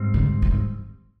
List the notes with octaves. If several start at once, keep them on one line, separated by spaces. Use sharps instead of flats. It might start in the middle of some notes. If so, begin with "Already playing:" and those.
Already playing: G#2 G3 C4
D3
D#3